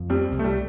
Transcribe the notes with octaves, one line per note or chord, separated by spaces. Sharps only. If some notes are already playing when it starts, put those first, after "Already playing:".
Already playing: F2
G3 C4
C2
A3
G3